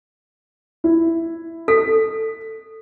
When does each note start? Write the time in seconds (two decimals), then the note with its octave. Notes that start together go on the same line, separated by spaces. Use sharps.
0.84 E4
1.68 A4 B6